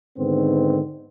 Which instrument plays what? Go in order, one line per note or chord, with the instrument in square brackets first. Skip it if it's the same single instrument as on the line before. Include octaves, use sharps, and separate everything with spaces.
[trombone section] G#2 D3 D#3 B3 C4